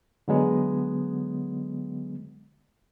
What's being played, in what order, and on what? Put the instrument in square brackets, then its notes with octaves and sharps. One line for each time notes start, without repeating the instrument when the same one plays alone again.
[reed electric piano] D3 F#3 G#3 B3